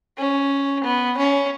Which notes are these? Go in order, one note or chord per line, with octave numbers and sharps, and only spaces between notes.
C#4
B3
C#4